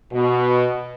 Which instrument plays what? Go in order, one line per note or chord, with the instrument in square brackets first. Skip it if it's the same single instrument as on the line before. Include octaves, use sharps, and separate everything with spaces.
[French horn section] B2